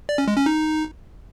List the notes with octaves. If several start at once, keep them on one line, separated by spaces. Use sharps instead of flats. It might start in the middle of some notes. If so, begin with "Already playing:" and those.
D5
C#4
G#3
C#4
D#4